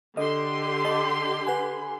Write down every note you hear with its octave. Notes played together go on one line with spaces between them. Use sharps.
D3 G4 D#5 C6
D#5 A5
B4 F#5 G#5